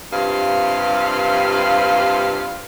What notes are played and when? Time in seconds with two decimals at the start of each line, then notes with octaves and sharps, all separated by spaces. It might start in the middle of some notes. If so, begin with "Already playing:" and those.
0.12 G2 C3 F4 B4 F5